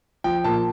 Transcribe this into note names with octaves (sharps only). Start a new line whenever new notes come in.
F3 G5
A#2 A5